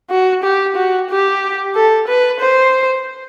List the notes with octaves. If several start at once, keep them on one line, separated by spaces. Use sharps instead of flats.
F#4
G4
F#4
G4
A4
B4
C5